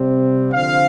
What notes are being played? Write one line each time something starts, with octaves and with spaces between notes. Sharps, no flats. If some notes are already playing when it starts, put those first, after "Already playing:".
Already playing: C3 G3 C4
D3 F3 C4 F5